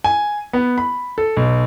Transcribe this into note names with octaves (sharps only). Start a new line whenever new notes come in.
G#5
B3
B5
A4
B1